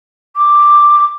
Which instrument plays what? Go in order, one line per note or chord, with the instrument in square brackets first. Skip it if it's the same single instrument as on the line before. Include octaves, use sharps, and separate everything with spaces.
[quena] D6